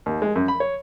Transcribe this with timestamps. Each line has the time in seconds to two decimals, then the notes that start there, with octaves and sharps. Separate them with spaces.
0.06 D#2
0.22 G#3
0.36 F#2
0.48 B5
0.60 C#5